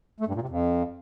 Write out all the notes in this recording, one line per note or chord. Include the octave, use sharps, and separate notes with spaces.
A3
G2
A#2
C3
F2